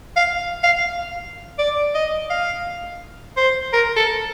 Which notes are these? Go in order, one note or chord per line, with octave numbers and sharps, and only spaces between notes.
F5
F5
D5
D#5
F5
C5
A#4
A4